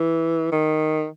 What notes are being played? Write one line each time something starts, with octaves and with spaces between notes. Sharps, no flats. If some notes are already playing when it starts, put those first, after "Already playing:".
Already playing: E3
D#3